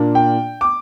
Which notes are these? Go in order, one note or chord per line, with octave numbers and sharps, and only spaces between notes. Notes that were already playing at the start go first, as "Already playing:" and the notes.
Already playing: A#2 A#3 D4
G5
D6